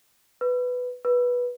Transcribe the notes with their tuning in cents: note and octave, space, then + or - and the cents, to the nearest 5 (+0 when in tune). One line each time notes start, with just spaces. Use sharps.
B4 +10
B4 -10